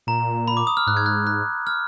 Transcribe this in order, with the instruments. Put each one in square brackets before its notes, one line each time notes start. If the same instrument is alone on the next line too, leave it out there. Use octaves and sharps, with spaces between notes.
[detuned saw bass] A#2 [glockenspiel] A#5
[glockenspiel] B5
D6
D#6
F6
[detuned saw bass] G#2 [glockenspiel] F#6
[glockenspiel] G#6
F#6
F#6
F6